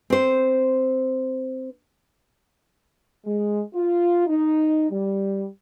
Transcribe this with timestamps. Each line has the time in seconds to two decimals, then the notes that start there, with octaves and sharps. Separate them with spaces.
0.10 C4 C5
3.25 G#3
3.74 F4
4.27 D#4
4.90 G3